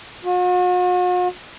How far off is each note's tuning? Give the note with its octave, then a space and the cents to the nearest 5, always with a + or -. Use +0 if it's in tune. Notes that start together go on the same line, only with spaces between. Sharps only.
F#4 -45